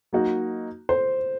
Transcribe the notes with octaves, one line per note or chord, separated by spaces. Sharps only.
F#3 A#3 D#4 F#4
C5